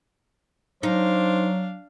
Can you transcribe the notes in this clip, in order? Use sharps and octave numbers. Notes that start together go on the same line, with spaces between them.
F#3 D4 D#4 C5 F5